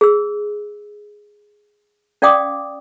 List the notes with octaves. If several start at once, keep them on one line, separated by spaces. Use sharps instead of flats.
G#4 E6
C#4 D5 F5 G5 D6 D#6